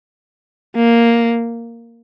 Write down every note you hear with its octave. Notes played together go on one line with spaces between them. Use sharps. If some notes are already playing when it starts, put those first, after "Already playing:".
A#3